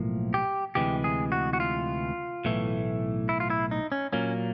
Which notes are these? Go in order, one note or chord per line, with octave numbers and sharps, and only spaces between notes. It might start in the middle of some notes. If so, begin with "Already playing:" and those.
Already playing: B1 A2 F3 A#3
G4
D2 C3 E3 G#3 G4
G#4
F#4
F#4
F4
B1 A2 E3 A3
E4
F4
E4
D#4
C#4
A#2 F#3 A#3 C#4